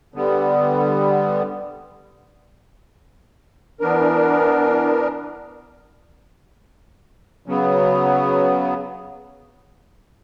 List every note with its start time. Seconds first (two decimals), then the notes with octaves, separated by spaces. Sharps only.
0.14 D3 G3 B3
3.80 E3 B3 D4 A#4
7.46 C#3 F#3 B3